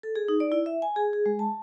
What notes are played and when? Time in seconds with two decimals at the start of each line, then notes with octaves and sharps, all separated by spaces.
0.03 A4
0.16 G#4
0.28 D#4
0.40 D5
0.52 E4
0.66 E5
0.82 G#5
0.96 G#4
1.13 G#4
1.26 G#3
1.39 A5